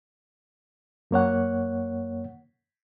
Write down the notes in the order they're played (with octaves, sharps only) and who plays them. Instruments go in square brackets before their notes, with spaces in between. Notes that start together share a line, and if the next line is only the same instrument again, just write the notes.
[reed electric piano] F#2 A#3 C#5 F#5